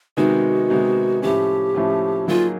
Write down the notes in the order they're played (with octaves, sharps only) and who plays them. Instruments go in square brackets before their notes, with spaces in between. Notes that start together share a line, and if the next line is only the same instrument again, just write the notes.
[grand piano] C3 D#3 G#3 B3 D#4 [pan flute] F#4
[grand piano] C3 D#3 G#3 B3 D#4
[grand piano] A2 F3 A3 C#4 [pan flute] G4
[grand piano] A2 F3 A3 C#4
[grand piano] F#3 A#3 D#4 G#4 [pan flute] F4